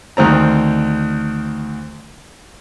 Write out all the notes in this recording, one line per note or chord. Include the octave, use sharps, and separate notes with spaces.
D2 D#3 C4 A#5